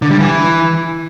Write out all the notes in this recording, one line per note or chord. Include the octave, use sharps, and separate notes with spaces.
D3
G3
E3